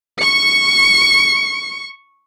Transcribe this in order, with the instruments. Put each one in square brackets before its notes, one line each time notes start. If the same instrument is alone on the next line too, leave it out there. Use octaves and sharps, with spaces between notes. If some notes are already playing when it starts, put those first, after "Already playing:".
[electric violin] C#6 C#7